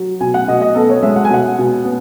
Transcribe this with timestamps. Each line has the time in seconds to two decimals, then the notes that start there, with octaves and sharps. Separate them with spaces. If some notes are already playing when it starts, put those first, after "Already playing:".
Already playing: F#3
0.20 B2 G#5
0.34 F#5
0.48 B2 D#5
0.61 D#5
0.75 B3 A4
0.89 C#5
1.03 G#3 E5
1.16 F#5
1.25 G#5
1.30 B2 F#5
1.58 B2
1.85 B3